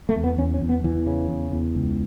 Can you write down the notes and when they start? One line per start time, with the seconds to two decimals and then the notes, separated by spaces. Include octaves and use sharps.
0.09 A3
0.16 E2
0.24 B3
0.38 E2 C#4
0.54 C#4
0.61 E2
0.69 B3
0.84 E2 E3
1.06 C#3
1.30 E2
1.52 E2
1.75 C#2